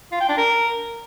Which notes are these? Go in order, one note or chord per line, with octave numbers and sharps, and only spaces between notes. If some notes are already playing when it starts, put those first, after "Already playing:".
F4
G5
D4
A#4